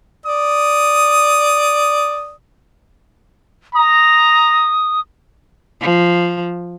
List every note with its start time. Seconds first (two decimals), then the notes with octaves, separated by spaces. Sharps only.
0.26 D5 D#6
3.75 A#5 D#6
5.81 F3